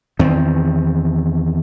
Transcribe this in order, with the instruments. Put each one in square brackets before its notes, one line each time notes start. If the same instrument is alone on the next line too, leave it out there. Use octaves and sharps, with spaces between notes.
[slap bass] E2 D#3 C4